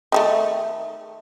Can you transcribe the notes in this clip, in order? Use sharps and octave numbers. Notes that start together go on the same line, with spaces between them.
D#3 G3 A3